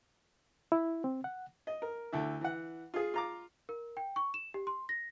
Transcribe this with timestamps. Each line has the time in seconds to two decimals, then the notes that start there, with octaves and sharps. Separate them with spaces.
0.72 E4
1.04 C4
1.24 F#5
1.67 D#5
1.82 A#4
2.12 D2 D3 E4
2.41 E3 F#5
2.94 F4 G#4
3.14 F4 A#5 D6
3.69 A#4
3.97 G5
4.16 C#6
4.34 E7
4.54 G4
4.67 C6
4.89 A#6